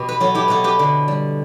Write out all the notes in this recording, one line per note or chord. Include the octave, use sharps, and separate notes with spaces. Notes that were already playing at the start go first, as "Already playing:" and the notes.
Already playing: B2 G4
B4
F#3 F#4 A4
E4 G4
B2 F#4 A4
G4 B4
D3
G3